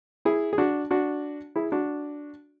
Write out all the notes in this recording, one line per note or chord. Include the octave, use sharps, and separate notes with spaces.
E4 G#4
G#4
D4 F#4
D4 F#4
E4 G#4
D4 F#4